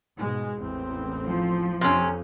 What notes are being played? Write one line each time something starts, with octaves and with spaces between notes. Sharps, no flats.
G#2 B2 G#3
A1 E2 C4
F3
F2 C3 C#4